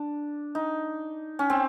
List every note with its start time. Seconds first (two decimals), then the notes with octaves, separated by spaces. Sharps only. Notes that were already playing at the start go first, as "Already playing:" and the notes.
Already playing: D4
0.55 D#4
1.39 C#4
1.50 C4